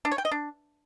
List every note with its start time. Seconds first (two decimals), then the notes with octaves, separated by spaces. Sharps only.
0.05 D4
0.12 C#5
0.18 G5
0.25 D#5
0.31 D4